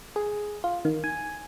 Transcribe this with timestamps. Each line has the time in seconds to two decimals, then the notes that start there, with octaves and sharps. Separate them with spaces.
0.16 G#4
0.64 F4
0.85 D#3
1.04 G#5